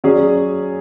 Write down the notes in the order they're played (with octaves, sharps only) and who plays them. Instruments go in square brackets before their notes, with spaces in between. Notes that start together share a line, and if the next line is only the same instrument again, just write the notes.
[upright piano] F#3 C#4 G#4 D5